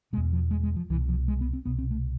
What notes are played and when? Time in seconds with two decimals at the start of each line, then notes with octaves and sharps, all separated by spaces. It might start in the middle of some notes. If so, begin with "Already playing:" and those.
0.13 B2 G#3
0.17 E2
0.33 F3
0.51 G#3
0.63 G#3
0.76 F3
0.90 C2 E3
0.93 B2
1.08 F3
1.28 G#3
1.41 B3
1.53 C4
1.66 C2 B2 B3
1.78 C4
1.91 A3